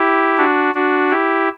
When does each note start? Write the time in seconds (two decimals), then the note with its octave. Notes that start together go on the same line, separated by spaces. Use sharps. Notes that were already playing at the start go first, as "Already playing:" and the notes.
Already playing: E4 G4
0.38 D4 F#4
0.74 D4 F#4
1.11 E4 G4